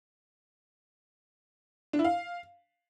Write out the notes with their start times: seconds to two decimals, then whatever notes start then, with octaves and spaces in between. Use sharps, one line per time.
1.93 D4
1.99 E4
2.04 F5